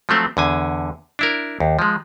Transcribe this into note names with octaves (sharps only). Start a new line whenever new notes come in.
F3 F#3 A3 C4
E2 D3 G#5
D4 E4 A#4
D#2
F3 G#3